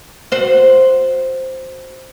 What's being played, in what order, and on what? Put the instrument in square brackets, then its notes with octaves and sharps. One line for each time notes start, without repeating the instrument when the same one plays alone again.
[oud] F#4 C5